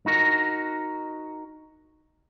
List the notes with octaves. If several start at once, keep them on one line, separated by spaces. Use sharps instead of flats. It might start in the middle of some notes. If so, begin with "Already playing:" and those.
D#4 F#4 A#4